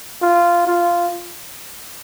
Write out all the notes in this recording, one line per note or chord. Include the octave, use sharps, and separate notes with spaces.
F4
F4